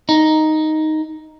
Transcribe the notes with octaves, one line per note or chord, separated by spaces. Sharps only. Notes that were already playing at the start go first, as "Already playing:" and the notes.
D#4